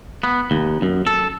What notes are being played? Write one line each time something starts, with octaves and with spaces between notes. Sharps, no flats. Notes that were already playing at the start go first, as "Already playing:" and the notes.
B3
D#2
F#2
A4